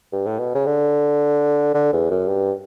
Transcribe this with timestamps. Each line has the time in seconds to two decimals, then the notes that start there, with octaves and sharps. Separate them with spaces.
0.12 G2
0.26 A2
0.39 B2
0.55 C#3
0.66 D3
1.74 D3
1.93 E2
2.11 F#2
2.28 G2